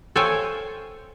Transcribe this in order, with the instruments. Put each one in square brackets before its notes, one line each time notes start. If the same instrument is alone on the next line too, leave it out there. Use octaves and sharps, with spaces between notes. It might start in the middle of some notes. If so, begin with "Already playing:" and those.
[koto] A4 C5 C#5 F5 G5 G#5